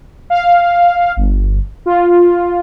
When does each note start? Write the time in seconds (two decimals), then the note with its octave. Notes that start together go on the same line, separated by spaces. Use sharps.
0.30 F5
1.16 G1
1.86 F4